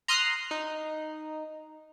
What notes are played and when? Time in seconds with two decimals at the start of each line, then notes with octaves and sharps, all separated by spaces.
0.08 A#5 C6 D#6 F6 F#6 C7
0.51 D#4